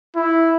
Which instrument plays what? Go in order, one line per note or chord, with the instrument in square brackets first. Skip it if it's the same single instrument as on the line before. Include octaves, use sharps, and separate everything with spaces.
[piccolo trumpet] E4